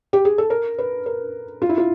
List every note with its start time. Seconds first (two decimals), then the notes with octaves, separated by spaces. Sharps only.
0.13 G4
0.25 G#4
0.38 A4
0.50 A#4
0.78 B4
1.06 A#4
1.62 F4
1.69 E4
1.78 F4